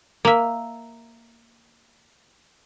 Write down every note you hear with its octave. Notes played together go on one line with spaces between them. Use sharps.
A#3 E5